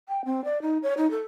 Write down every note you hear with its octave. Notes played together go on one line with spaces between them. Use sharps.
G5
C4
D5
D#4
C#5
D#4
A4